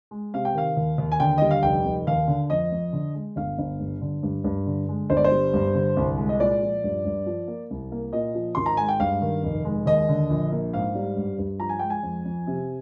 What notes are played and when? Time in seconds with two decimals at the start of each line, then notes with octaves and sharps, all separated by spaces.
0.11 G#3
0.34 C3 F5
0.45 G5
0.54 D#3 F5
0.77 D#2
0.98 D#2
1.12 G#5
1.20 D3 G5
1.38 G3 D#5
1.51 F5
1.63 F1 G5
1.85 F1
2.07 D#2 F5
2.28 D3
2.50 F2 D#5
2.72 F2
2.93 D3
3.14 G#3
3.36 G1 F5
3.58 G1
3.80 G2
4.01 D3
4.23 G2
4.44 G2
4.67 D3
4.89 G#3
5.10 G1 C5
5.17 D5
5.24 C5
5.31 G3
5.54 G2
5.75 D3
5.97 C2
6.18 G#3
6.29 D#5
6.40 A#2 D5
6.62 F3
6.84 G2
7.05 G2
7.26 F3
7.48 A#3
7.70 C2
7.92 A#3
8.13 A#2 D#5
8.35 F3
8.55 G#1 C6
8.66 A#5
8.77 G#3 G#5
8.89 G5
9.00 G2 F5
9.22 D#3
9.43 F1
9.65 G#3
9.86 D#2 D#5
10.09 D3
10.30 A#1
10.52 A#3
10.74 G#2 F5
10.95 G3
11.16 G2
11.38 G2
11.60 F3 A#5
11.69 G#5
11.79 G#3 G5
11.90 G#5
12.03 F2
12.25 F2
12.47 C3